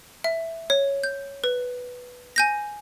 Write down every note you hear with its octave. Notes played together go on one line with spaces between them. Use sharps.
E5
C#5
G6
B4
G#5 G6 A#6